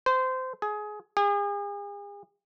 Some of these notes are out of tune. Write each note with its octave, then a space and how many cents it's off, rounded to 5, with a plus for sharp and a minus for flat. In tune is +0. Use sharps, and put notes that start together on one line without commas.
C5 -20
G#4 +20
G#4 -40